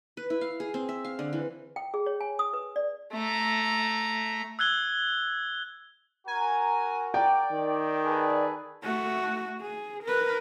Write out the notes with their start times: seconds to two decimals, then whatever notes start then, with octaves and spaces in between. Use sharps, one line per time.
0.17 B4
0.30 E4
0.41 F5
0.60 G#4
0.74 C4
0.89 E5
1.05 F5
1.19 D3
1.33 E3
1.76 G5
1.94 G#4
2.06 C#5
2.21 G#5
2.39 D#6
2.54 B4
2.76 D5
3.14 A3 A#5
4.59 E6 F#6 G#6 G7
6.28 F#4 A#4 G#5 A#5
7.14 D5 G5
7.52 D#3
8.04 G#4 A4 B4
8.82 A3 F#4
9.61 G#4
10.04 A#4 B4